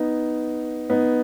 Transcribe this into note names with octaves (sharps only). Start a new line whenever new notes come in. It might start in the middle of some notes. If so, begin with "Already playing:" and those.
Already playing: B3 D#4
B3 D#4